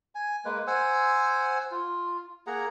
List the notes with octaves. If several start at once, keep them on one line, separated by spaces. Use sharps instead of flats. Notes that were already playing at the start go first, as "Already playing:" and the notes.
G#5
G#3 A#3 B4
C5 F#5 G#5 E6
F4
A#3 G#4 F#5 A#5